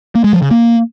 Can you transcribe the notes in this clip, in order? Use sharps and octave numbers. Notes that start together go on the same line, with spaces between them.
A#3
G#3
F3
C#3
A#3